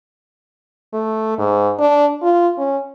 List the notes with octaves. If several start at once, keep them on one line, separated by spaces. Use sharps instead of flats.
A3
G#2
D4
F4
C#4